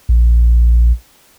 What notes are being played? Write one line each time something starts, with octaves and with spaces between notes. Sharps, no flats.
A#1